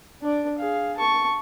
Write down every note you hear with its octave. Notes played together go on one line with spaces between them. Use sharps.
D4 D5
G#4 F5
A5 C#6